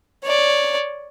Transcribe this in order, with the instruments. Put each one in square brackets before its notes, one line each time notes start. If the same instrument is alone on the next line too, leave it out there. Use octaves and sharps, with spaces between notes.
[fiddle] C#5 D5